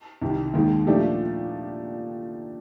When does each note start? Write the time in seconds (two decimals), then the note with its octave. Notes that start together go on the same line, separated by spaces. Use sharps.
0.22 C2 C3 D#3
0.54 D#2 D#3 G#3
0.87 A#2 F3 A3 D4 G4